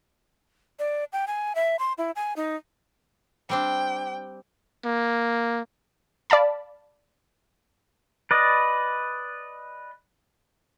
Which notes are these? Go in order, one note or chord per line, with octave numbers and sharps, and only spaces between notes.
D5
G5
G#5
E5
C6
E4
G#5
D#4
G3 C4 D4 G5
A#3
D5 F5 A5 B5
B4 D5 D#5